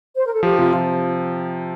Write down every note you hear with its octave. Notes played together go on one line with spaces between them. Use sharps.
C5
A#4
A4
F3 G4
C3 F4
F3